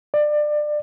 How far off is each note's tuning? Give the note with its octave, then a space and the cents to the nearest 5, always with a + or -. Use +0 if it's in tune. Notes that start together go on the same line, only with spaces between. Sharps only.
D5 +25